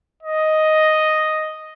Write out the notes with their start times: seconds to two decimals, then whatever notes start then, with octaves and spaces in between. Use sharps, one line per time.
0.23 D#5